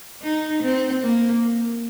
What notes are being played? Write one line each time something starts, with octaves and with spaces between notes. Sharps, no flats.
D#4
C4
A#3